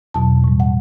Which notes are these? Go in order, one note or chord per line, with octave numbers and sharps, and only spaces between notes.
E2 B2 F#3 A5
A2 E3 G3
F#5